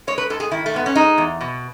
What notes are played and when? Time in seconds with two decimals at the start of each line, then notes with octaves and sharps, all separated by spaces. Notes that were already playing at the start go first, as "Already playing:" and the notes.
0.07 G#3 C#5
0.18 B4
0.30 G#2 A4
0.40 G#4
0.51 D#3 E4
0.66 A3
0.74 G#2 B3
0.86 C#4
0.96 G#3 D#4
1.18 E2
1.41 B2